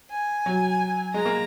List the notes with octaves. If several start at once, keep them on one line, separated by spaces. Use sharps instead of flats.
G#5
F#3
G#3 A#5
A#3